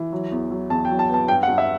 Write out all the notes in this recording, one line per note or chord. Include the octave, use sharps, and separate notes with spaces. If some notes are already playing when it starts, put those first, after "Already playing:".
Already playing: E3
F#3
E2
F#3
E2 A5
G5
F#3
A5
B3 A5
G2 G5
F#5
G2
E5